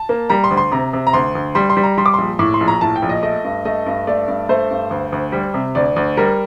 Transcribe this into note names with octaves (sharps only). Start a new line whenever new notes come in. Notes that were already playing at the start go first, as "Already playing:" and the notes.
Already playing: A5
A#3
G3 A#5
C6
D2
C6
C3 A#5
C3
A#5
D2 C6
D2
G3 C6
C6
G3
A#5
G3 C6
D6
A#1 C6
A2 D6
C6
A#1
A#5
A2 A5
G5
A#1
D#5
A3 D#5
G2
A3 D#5
G2
A3 D5
G2
A3 C5
G2
D2
D2
G3
C3
D2 D5
D2
G3 A#4